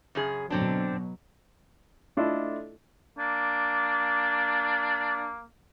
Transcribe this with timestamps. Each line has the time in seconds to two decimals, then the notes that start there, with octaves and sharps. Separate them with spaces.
0.15 F#2 C#3 G#4
0.50 B2 D3 F#3 C4 D4
2.17 A3 D4 E4 F4 A4 D#5
3.18 A#3 D4